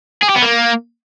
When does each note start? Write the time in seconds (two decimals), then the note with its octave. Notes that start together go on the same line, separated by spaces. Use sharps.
0.22 G#4
0.29 G4
0.36 B3
0.42 A#3